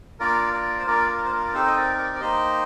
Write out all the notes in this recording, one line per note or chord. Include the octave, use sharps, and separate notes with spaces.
A#3 D4 F4 A#4 D5
A#4 D5
C5
A#3 D4 F4 A#4 D5
A#4
C5
A#4
D5
C4 D#4 G4 A4 C5
D#5
A#4 D5
A#4 D5
D5
A#3 D#4 G4 C5 D#5